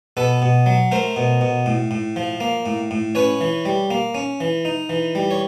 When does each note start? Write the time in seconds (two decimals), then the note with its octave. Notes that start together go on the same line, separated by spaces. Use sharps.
0.17 B2 A4 B4
0.42 B2
0.66 F#3
0.92 A3 A#4 C5
1.16 B2
1.41 B2
1.66 A2
1.91 A2
2.16 F3
2.40 A#3
2.66 A2
2.91 A2
3.15 C#4 B4 C#5
3.41 E3
3.66 G3
3.91 A#3
4.15 C#4
4.41 E3
4.65 D#4
4.89 E3
5.15 G3
5.31 C#5